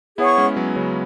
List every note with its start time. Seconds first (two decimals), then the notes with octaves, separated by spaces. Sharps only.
0.18 B3 E4 G#4 C#5 F#5 C#6
0.38 G#3 C#4
0.57 F#3 B3
0.76 C#3 F#3